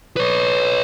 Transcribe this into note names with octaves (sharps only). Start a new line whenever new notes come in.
B4 C#5